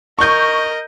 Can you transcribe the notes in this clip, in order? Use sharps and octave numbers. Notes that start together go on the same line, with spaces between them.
A#4 D#5 C#6 G6